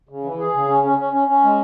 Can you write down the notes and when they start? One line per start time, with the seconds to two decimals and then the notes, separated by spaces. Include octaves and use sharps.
0.09 C#3
0.24 E3
0.39 G#4
0.54 C#3
0.68 C#4
0.83 C#4
0.98 C#4
1.13 C#4
1.28 C#4
1.44 G#3